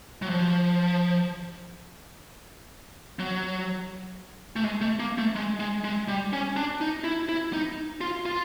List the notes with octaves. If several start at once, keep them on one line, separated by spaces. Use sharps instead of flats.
F#3
F3
F#3
A3
G#3
A3
A#3
A3
G#3
G#3
G#3
G3
C#4
D4
D#4
E4
E4
D#4
F4
F4